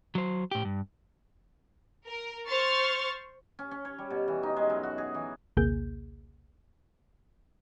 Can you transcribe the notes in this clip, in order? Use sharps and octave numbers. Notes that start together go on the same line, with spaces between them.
F#3 C5
A2 G4
G2
A#4
C5 C#6 F6 A6
C#4
C#4
C#5
G3
B2
E3
D#4
G#3
F#2
F#4
G#4
E3
A#1 D#2 C3 A#3 G#4 G6